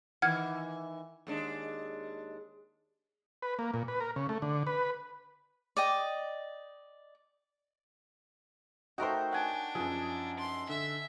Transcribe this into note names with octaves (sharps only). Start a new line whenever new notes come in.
D#3 E3 F#5 F6 G#6
D#2 G#3 D4
B4
A#3
A#2
B4
A#4
C#3
A3
D3
B4
D5 D#5 G5
A3 D#4 F#4 A#4 C5 C#5 G5
D4 F#5 G#5
F#2 F3 G#4
C6
D3 E5